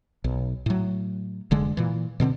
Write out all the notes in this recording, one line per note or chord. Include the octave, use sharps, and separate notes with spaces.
B1
A2 F#3
F1 D3 G#3
A#2 E3
B2 D3 A#3 C4